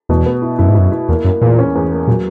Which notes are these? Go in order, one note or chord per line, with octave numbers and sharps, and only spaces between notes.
E2 B2
B3
E4
F#2 E4
G#2
F#2 E4
E4
E2 A#3
F#2 A#3
E2 A#2
C#4
E2
A#3
A#2 F#3